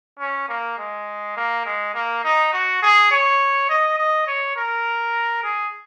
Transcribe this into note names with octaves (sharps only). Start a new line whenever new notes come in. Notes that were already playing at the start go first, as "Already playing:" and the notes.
C#4
A#3
G#3
A#3
G#3
A#3
D#4
F#4
G#4
C#5
D#5
D#5
C#5
A#4
G#4